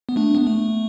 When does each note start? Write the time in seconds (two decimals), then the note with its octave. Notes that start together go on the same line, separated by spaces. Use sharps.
0.09 B3
0.16 A3 D4
0.35 B3
0.47 A3